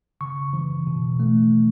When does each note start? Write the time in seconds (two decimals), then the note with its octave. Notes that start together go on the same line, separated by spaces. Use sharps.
0.21 C#3 C#6
0.53 E3
0.87 B2
1.20 A3